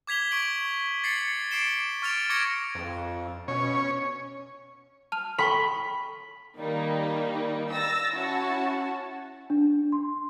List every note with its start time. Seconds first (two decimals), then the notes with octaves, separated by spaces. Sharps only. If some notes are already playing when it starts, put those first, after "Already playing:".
0.07 D6 G#6 B6 F7 G7
0.31 C#6 D7 F#7
1.04 A6 C7 C#7 F#7
1.51 D6 C7 D7 E7 G7
2.02 C#6 F6 A6 D7 F7
2.30 C#6 D6 G#6 A#6 C#7 D7
2.75 F2
3.48 B2 C#4 C#5
5.12 A5 F6 F7
5.38 A4 G5 B5 C#6
6.57 D#3 G3 A#3 D#4
7.71 E6 A6 A#6
8.13 C#4 E4 F#4 A5
9.50 D4
9.92 C6